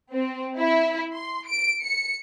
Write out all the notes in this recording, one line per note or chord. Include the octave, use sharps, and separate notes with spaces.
C4
E4
C6
D7
C#7